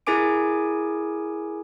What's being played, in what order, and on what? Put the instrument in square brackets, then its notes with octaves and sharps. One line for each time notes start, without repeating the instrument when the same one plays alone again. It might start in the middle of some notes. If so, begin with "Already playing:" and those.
[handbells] E4 G#4 A#4 G#5 D6 D7